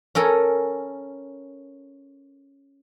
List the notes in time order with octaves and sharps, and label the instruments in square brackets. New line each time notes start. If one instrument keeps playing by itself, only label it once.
[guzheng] C#4 A4 A#4 G#5